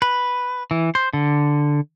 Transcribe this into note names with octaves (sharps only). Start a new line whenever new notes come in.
B4
E3
C5
D3